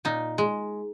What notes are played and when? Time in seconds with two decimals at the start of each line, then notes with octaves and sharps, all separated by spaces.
0.05 A#2 D#4
0.38 G#3